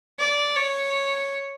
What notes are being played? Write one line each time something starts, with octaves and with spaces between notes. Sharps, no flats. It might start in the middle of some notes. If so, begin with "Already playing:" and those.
D5
C#5